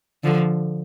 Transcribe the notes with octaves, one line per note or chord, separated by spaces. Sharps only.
D3 F3